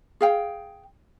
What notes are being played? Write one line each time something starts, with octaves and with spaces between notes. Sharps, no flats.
G#4 F5 G5